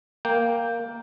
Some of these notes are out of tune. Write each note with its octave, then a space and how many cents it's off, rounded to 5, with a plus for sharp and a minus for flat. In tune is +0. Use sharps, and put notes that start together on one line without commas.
A#3 +0 G5 +5